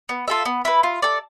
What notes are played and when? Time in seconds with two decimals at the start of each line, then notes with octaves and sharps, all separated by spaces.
0.09 B3
0.28 F4 A4 E5
0.45 B3
0.65 E4 B4
0.83 F4
1.02 A4 D5